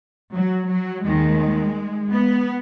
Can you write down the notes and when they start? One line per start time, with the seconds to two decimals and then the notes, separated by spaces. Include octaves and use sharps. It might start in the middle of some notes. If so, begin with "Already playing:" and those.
0.34 F#3
0.70 F#3
1.05 D#2 D#3 G#3
2.12 B3